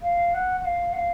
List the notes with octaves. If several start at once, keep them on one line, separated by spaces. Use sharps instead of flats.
F5
F#5
F#5
F5
F#5
F5